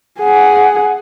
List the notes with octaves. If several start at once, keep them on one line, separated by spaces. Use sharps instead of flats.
G#4 F#5